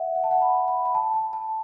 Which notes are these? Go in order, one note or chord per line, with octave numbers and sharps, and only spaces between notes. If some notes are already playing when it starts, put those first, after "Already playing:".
Already playing: E5 F#5
F#5
A5
F#5
B5
B5
B5
A5
A5
A5